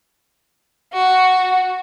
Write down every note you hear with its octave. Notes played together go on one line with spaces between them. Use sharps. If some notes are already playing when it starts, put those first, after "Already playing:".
F#4